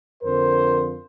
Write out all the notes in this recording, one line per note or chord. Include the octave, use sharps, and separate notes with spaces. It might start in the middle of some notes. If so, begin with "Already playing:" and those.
F2 D3 F3 A#4 C5